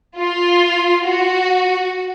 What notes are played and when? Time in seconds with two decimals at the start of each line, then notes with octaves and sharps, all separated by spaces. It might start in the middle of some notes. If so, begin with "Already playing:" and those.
0.17 F4
1.04 F#4